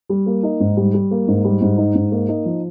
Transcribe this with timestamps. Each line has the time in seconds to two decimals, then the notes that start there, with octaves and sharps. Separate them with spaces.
0.10 G3
0.26 A#3
0.43 D#4
0.60 G#2
0.77 G3
0.94 G3
1.11 A#3
1.28 G#2
1.45 G3
1.61 G#2
1.77 D#4
1.95 G#2
2.12 A#3
2.29 D#4
2.45 F3